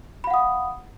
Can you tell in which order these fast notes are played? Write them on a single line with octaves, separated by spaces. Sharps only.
B5 F5 F#5 D#6